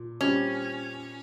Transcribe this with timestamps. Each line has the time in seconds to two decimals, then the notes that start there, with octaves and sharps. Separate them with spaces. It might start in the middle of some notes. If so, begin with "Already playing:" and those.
Already playing: A#2
0.20 A#2 G3 C4 C#4